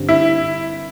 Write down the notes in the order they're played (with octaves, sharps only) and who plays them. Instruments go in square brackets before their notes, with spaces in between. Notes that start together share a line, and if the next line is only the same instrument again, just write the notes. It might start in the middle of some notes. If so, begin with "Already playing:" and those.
Already playing: [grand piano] G2 D3 G3 C4
[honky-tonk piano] E4